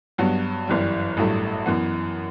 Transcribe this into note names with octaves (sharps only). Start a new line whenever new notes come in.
G2 F#3 B3
G1 F#2 E3 G3
A1 G2 F#3 A3 E4
F#2 E3 B3